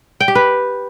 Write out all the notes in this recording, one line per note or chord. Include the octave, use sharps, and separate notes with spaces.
G5
G4
B4